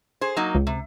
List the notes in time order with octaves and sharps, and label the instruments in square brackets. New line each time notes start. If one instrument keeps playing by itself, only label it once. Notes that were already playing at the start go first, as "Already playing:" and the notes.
[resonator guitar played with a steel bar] G#4 C5
F#3 A#3 D#4
[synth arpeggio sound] C#2
[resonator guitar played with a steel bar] C3